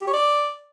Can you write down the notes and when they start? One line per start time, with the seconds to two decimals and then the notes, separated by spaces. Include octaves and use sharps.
0.01 G4
0.07 C#5
0.13 D5